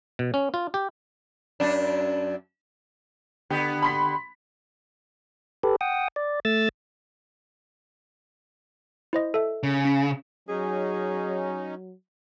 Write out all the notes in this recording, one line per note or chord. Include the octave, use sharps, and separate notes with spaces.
B2
C#4
F4
G4
F#2 D4
D3 B3 G4
B5 C6 B6
G4 A4 B4
F#5 G5 D#6
D5
A3 E6 A6
E4 C5 D#5
A4 E5
C#3
C#4 B6
F#3 C#4 D#4 G#4